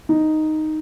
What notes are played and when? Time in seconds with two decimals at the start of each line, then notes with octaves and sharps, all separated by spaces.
0.09 D#4